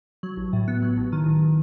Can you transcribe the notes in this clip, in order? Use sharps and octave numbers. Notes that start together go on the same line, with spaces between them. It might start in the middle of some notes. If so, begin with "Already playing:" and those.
F#3
A1
A2
B3
F#3
A1
D#3
A1